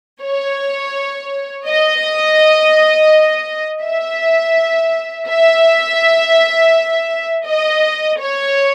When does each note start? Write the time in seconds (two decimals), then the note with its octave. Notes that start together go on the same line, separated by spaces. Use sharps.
0.21 C#5
1.66 D#5
3.84 E5
5.29 E5
7.47 D#5
8.20 C#5